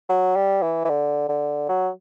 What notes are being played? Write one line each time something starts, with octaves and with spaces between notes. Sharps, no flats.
F#3
G3
E3
E3
D3
D3
F#3